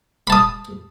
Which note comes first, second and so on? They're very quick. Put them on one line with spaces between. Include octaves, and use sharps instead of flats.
B5 A5 D#6